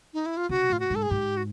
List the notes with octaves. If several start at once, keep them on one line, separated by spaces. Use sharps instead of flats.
D#4
E4
F4
C#3 F#4
A2 F4
F#4
G#2
A4
G#4
G#2 G4
F#4